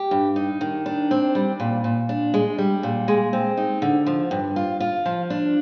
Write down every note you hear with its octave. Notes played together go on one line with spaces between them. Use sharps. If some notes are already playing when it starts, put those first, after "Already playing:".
Already playing: G4
G2
D#4
D#3
D4
C4
G3
A#2
A#2
D4
G#3
G3
A#2
G#3
C4
D#4
D3
F3
G2
F4
F4
F3
D4